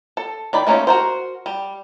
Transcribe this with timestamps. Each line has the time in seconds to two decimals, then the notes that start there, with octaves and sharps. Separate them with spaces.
0.17 A4
0.53 D#3 D5 B5
0.67 A3 A#3 C#4 D#4 F4
0.87 F#4 A#4 C5
1.46 G3